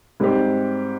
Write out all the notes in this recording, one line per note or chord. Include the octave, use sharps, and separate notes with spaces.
G#2 G3 C4 G4